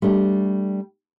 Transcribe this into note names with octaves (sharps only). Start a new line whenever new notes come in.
G3 A3 D4